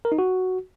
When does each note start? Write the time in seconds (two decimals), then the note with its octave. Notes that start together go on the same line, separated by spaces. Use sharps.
0.05 A#4
0.12 D#4
0.19 F#4